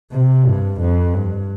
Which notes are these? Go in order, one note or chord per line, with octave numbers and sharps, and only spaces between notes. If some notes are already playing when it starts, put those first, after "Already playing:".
C3
G2
F2
G2